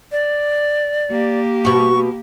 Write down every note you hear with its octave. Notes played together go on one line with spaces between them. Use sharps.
D5
A#3 G4
B2 F#4 C#6